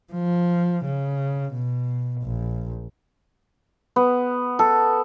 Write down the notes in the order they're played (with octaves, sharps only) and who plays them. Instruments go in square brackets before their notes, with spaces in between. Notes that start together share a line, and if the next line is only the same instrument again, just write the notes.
[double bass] F3
C#3
B2
A#1
[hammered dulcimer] B3
A4